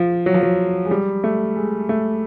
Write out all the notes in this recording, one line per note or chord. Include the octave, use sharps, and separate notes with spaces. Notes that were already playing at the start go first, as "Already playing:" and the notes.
Already playing: F3
F#3
F3
F#3
G#3
G3
A3
G#3
A3